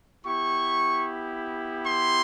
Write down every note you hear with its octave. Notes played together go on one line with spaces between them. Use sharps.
B3 E4 G4 C#6
C6